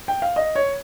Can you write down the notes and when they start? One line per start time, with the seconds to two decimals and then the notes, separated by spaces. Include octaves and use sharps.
0.08 G5
0.22 F5
0.36 D#5
0.55 C#5